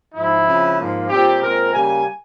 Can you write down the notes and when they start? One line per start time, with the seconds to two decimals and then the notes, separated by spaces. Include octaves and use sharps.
0.13 G#2 F3 G#3 E4
0.45 C#3 F3 G#3 C4
0.77 G#2 F3 A#3
1.08 A#2 G3 C4 G4
1.40 A#2 G#3 C4 A#4
1.72 C#3 G3 A#3 G#5